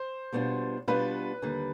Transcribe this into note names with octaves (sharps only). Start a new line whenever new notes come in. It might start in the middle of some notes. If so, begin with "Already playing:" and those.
Already playing: C5
B2 G3 B3 D4 F4
B2 G3 B3 D4 F4 B4
D#2 D3 G3